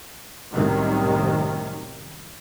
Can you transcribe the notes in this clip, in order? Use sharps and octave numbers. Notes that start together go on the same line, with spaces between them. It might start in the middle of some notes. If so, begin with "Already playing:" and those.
C2 F#2 A2 C3 D#3